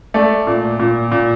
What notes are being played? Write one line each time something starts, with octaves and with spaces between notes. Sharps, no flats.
A3 D5
A#2
A#2
A#2